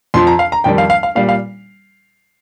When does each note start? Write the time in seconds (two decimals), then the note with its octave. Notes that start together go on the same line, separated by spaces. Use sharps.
0.14 F2 F3 C6
0.27 A#5
0.39 F5
0.52 A#5
0.64 F2 D#3 G3 G5
0.78 F5
0.90 F5
1.03 F5
1.15 A#2 G3 F5
1.29 F5